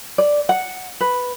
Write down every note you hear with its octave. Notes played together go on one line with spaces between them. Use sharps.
D5
F#5
B4